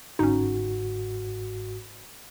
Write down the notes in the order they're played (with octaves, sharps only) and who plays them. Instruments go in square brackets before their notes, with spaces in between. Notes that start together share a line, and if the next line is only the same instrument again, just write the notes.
[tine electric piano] G1 G#2 F#4 [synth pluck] C#4 D#4